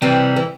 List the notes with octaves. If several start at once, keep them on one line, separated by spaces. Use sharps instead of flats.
C3 E3 G3 C4
E3